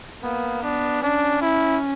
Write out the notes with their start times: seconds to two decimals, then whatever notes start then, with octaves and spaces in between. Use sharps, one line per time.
0.23 A#3 B3
0.62 B3 D4
1.02 C#4 D4
1.42 E4